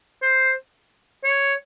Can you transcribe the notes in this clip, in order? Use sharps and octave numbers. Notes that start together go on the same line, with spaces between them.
C5
C#5